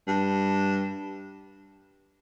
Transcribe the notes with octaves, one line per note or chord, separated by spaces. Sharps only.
G2